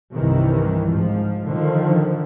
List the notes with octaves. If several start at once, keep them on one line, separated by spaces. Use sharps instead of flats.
C2 G2 C3 D#3 E3
G#2 F3
D3 D#3 F3